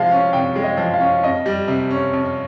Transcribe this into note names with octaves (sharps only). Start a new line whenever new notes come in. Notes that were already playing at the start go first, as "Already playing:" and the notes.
Already playing: C3 F3 G#3 F5
C#4
C3 G5
G#3
D#5
F3
F5
C#4
F2 D#5
G3
C3
C#4
F2